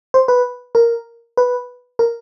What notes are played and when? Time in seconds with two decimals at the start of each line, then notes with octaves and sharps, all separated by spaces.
0.14 C5
0.28 B4
0.75 A#4
1.37 B4
1.99 A#4